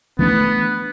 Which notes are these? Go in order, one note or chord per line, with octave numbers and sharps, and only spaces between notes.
E3 A3 B3 D4